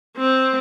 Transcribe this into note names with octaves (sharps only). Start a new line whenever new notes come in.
C4